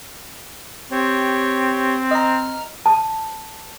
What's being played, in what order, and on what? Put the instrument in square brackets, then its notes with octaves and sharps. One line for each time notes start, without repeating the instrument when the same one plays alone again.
[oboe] C4 [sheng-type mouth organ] G4 C#5
[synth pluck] D#5 A#5 [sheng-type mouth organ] F6
[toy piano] A5